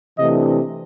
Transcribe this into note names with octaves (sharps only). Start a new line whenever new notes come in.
C3 E3 A3 D4 D#5